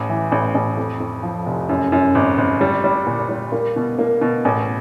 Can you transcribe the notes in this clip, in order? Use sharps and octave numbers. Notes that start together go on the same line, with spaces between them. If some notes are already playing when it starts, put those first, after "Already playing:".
Already playing: A1
E3
A1
A1
F2
F2
F3
F1
F#2
F#2
G#1
G#1
G3
G3
A#2
G3
A#3
B2
A#3
B2
A1